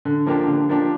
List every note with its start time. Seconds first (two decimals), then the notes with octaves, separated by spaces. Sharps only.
0.05 D3
0.26 F3 A#3 D4 G4
0.47 D3
0.69 F3 A#3 D4 G4